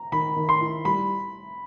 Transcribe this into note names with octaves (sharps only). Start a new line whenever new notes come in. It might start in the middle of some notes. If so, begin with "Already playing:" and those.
Already playing: A#5
D#3 B5
D#3
C6
E4
G3 B5